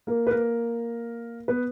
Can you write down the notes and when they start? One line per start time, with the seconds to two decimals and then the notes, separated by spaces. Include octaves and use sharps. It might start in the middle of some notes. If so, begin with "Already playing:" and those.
0.07 A#3 A#4
0.27 B4
0.31 A#3 A#4
1.48 B3 B4